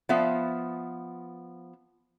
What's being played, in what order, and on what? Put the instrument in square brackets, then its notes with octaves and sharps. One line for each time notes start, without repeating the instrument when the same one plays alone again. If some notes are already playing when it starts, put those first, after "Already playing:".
[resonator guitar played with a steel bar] F3 B3 E5 F5